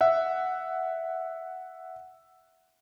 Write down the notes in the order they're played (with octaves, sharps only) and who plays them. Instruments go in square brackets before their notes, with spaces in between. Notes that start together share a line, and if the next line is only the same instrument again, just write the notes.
[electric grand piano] E5 F#5